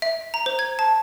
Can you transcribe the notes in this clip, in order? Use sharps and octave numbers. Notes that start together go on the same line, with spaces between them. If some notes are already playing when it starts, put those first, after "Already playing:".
E5
A#5
C5
G#6
A5